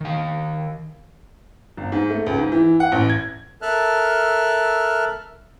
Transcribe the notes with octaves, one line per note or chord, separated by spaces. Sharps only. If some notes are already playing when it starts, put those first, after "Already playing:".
D#3 F5
G1
G#2
A3
C#2
G#2
E3
F#5
A1
G#6
A4 A#4 E5 A5 F6 F#6